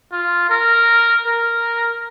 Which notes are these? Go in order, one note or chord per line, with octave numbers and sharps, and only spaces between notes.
F4
A#4
A#4